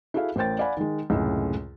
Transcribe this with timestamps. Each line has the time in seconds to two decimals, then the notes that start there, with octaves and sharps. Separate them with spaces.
0.14 E4 F#4 G#4 A4 F5
0.36 A1 A#4 C5 G5 A6
0.59 D5 F5 F#5 G#5 B5
0.77 D#3 G#3
1.10 C#2 F#2 A2 C3 G#3 A3